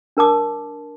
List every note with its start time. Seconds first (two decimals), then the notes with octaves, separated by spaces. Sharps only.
0.17 D4 A#4 A5 D6